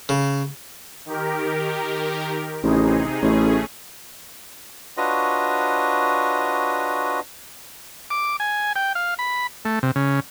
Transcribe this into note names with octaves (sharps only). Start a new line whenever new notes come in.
C#3
D#3 G4 A#4
A1 C3 D#4 G#4
A1 A3 C#4 G#4
D4 F4 F#4 B4 C#5 D#5
D6
G#5
G5
F5
B5
A3
C3
C#3